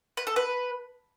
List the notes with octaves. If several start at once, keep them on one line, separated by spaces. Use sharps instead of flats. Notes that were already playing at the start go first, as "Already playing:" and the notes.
B4
A4
B4